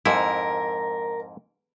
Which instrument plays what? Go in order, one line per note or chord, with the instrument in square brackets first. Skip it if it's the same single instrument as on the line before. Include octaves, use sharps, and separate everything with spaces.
[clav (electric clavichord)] F2 G#2 E4 [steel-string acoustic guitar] A#4